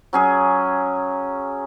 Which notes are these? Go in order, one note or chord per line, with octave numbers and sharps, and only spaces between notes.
F#3 C#4 G#4